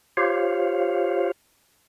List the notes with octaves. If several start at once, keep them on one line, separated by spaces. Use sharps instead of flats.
F4 G4 C5 C#5 F5